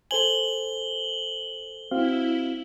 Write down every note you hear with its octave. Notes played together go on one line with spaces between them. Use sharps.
A4 C5 G#5 F#7 G7
C4 E4 F#4 F5